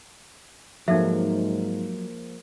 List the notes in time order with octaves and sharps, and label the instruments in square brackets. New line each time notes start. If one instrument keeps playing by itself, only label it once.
[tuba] G#2 [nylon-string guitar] F3 G#3 A#3 [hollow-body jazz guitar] F#3 [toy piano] D#4 A4 E5